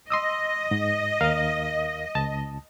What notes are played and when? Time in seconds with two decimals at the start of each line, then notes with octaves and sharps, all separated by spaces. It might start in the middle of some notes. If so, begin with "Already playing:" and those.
0.10 D#5 C6 D#6 E6
0.71 G#2
1.21 D#2 A#4 F5
2.15 C#2 A5